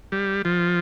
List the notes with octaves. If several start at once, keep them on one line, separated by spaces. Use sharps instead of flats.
G3
F3